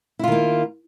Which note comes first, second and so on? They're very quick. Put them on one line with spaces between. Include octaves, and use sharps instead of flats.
E4 F4 D#3 A#3